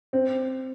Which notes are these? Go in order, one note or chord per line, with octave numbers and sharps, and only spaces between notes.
C4